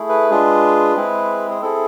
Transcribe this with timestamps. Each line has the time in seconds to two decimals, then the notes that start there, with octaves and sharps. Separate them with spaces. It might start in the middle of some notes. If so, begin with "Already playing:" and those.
Already playing: A3 E4 G#4
0.09 B4
0.31 G#3 D4 F4 G#4
0.96 G#3 C4 E4 G#4
1.50 G#4
1.62 C4 E4 G#4 A4